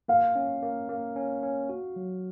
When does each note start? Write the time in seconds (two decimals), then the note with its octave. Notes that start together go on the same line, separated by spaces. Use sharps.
0.08 A#3 F5
0.35 C#4
0.63 A#3
0.89 A#3
1.16 C#4
1.43 C#4
1.69 F#4
1.96 F#3